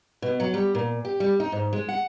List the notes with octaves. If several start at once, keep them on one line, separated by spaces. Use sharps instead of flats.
B2
F#3
G3
A#2
G4
G3
D#4
G#2
G#3
F#5